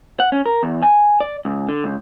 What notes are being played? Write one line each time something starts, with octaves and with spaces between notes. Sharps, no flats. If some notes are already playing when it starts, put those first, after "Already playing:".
F#5
C#4
A#4
E2
G#5
D5
C#2
D3
C#2